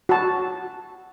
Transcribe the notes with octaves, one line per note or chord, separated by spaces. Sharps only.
F#4 A5